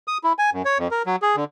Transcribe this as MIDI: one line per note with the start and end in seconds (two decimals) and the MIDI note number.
0.08 0.18 87
0.24 0.33 64
0.39 0.50 80
0.53 0.62 42
0.65 0.78 73
0.78 0.88 41
0.91 1.02 70
1.06 1.16 54
1.22 1.36 68
1.36 1.44 50